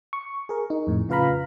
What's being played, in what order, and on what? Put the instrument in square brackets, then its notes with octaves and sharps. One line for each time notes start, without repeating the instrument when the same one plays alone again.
[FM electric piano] C#6
G#4 A#4
D#4
F2 A2
C#3 F4 B4 F5 A#5 B5